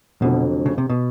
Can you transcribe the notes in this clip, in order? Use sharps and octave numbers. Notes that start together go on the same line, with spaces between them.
F1 F2 B2 D3 F#3 A3
C#3
C3
B2